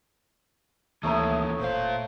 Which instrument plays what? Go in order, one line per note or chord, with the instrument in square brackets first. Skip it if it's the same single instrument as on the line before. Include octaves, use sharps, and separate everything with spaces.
[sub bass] D2 [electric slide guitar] E3 A#3 C#4 [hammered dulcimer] A3 C#5 A#5 [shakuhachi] D#6
[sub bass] F1 [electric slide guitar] A#2 F5 [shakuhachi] C5